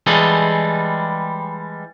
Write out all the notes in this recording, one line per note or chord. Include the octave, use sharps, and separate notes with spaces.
E3 G3 G#3 G#4 A4